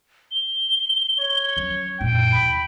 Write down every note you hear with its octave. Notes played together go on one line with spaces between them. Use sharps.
G7
C#5
F#3 C#4
F#2 A#2 G5
D#2 C3 B5